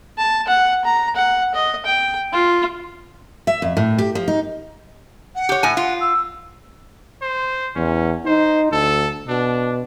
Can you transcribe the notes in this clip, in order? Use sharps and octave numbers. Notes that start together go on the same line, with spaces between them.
A5
F#5
A#5
F#5
D#5
G5
F4
E5
F2
A2
G4
F3
D#4
F#5
G4 C#5
A2 G#5
F4
E6
C5
E2 C#4
D#4 C5
D2 A4
B2 D4